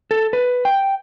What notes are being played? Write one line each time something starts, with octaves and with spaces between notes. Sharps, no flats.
A4
B4
G5